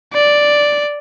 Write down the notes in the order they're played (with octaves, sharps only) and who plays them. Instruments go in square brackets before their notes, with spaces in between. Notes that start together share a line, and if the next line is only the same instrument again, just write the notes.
[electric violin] D5